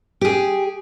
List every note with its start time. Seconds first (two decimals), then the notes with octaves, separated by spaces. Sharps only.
0.21 G4 G#4